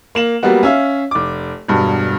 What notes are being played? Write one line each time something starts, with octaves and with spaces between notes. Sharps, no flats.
A#3 E7 F#7
F#3 G3 A#3 B3 F#4
C#4 E5 F5
F1 D6
E1 G2 B2